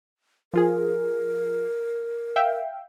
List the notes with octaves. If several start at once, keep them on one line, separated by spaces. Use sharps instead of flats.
F3 F4 G#4 A#4
E5 F5 G5